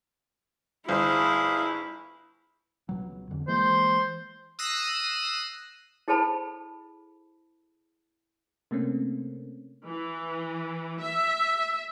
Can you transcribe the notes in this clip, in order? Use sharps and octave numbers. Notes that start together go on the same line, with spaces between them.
G1 E4 G#4 C5 F5
C#2 B2 F#3
E1 F2 D3
E3 G#3 A#3 C5
D#6 E6 F#6 A#6 C7 D#7
E4 G#4 A4 C5 A5 B5
C3 A3 A#3 C4 C#4
E3
E5